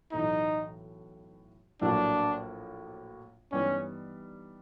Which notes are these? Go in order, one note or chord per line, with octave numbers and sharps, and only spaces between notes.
B1 A2 E3 A3 D#4
A#1 A2 F#3 A#3 D4
G2 E3 G3 B3 C#4 D#4